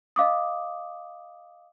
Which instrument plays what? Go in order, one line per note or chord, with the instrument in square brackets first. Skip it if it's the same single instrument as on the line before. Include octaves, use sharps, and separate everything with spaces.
[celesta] D#5 F5 D6 D#6